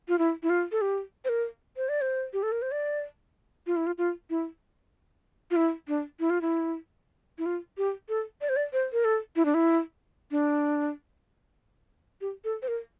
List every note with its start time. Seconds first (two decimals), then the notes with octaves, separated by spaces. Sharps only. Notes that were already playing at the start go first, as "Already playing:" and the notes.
0.08 F4
0.19 E4
0.43 E4
0.50 F4
0.72 A4
0.81 G4
1.25 C5
1.29 A#4
1.77 C5
1.89 D5
2.01 C5
2.33 G4
2.43 A4
2.52 A#4
2.62 C5
2.72 D5
3.67 F4
3.76 E4
3.86 F4
3.98 F4
4.30 E4
5.51 F4
5.56 E4
5.88 D4
6.20 E4
6.30 F4
6.41 E4
7.38 E4
7.46 F4
7.78 G4
8.09 A4
8.41 D5
8.49 C5
8.56 D5
8.73 C5
8.93 A#4
9.05 A4
9.36 E4
9.45 D4
9.54 E4
10.31 D4
12.21 G4
12.44 A4
12.62 C5
12.68 A#4